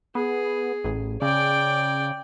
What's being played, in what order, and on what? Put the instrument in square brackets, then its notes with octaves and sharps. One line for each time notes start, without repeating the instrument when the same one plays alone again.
[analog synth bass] B3 [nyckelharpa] G#4
[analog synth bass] A1
[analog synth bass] C#3 [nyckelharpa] D5 G5